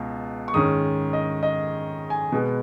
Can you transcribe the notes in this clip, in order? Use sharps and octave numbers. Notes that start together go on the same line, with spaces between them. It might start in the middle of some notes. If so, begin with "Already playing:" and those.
Already playing: C#2 B2
C#6
G#2 D#3 G#3 C#4 D#6
D#5
D#5
G#5
B2 G#3 B3